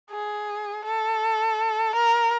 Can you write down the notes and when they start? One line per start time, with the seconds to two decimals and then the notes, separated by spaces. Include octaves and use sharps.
0.11 G#4
0.84 A4
1.95 A#4